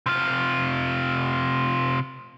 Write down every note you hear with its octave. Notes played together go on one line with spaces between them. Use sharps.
C3 F4